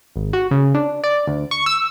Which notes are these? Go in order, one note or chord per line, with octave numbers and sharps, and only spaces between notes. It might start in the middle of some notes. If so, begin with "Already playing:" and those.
G#1
F#4
C#3
D4
D5
D2
C#6
E6